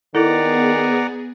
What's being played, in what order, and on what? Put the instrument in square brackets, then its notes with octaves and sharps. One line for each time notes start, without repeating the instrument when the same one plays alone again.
[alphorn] D#3 [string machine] B3 G#4 [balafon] E4 A4 [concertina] D5 F#5 A#5